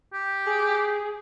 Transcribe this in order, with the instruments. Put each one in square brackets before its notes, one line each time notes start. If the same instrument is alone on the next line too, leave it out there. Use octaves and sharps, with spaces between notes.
[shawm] G4
[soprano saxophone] G#4